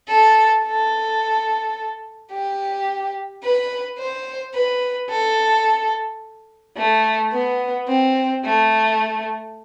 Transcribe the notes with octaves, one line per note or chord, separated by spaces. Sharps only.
A4
A4
G4
B4
C5
B4
A4
A3
B3
C4
A3